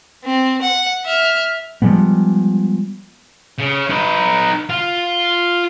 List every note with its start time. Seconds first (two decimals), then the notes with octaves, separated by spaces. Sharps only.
0.25 C4
0.62 F#5
1.05 E5 F6
1.82 F3 G3 G#3 B3
3.58 C#3
3.89 D#4 B4
4.69 F4